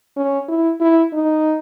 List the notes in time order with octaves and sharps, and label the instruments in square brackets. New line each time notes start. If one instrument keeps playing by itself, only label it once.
[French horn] C#4
E4
E4
D#4